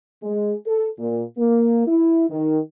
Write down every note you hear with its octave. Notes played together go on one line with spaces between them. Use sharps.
G#3
A4
A#2
A#3
E4
D#3